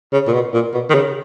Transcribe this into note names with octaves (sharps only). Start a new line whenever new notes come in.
C#3
A#2
B2
A#2
B2
D#3
C#3